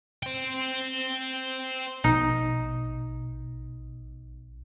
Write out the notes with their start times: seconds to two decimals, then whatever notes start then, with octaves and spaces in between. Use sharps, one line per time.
0.23 C5 G5
2.04 A#1 B2 D#4